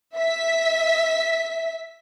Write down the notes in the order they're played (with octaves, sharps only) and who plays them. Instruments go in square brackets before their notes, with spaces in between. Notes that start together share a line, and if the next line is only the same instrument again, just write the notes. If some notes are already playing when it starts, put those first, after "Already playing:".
[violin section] E5 B6